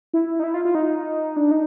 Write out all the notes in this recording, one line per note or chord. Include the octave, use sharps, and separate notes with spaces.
E4
D#4
E4
F4
F4
D#4
D4
D#4